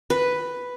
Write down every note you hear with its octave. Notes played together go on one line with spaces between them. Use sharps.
B4